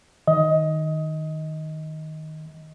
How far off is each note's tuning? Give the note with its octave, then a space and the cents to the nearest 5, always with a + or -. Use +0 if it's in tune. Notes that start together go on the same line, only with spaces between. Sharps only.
D#3 +0 D#5 +20